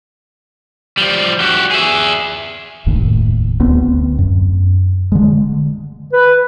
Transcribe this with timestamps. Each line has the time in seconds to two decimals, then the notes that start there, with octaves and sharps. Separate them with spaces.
0.97 F3 G3
1.40 F#4 G4
1.71 G#4 E5
2.86 F1 D#2 A2
3.60 D2 B3 C4
4.19 F#2
5.12 D3 G#3
6.13 B4